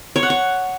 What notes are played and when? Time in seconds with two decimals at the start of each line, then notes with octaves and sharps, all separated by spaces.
0.16 C#5
0.23 F#5
0.30 C#6